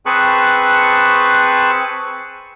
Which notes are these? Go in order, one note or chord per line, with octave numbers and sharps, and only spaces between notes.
C4 G#4 B4 A5 C#6 F#6